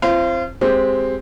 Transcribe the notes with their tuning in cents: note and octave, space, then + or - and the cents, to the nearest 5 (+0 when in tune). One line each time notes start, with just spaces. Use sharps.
C4 +15 F4 -35
G#3 -10 C4 +0 G4 +0